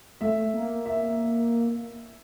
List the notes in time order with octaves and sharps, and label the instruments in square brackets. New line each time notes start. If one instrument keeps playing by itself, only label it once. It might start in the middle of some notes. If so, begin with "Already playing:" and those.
[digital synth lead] A3 [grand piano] E5
[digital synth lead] A#3
[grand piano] E5